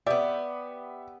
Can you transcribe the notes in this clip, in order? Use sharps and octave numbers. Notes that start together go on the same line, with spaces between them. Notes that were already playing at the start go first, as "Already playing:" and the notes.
B3 G4 D5 E5